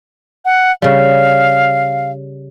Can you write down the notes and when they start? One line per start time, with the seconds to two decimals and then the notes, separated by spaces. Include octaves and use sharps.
0.45 F#5
0.82 C#3 G3 F5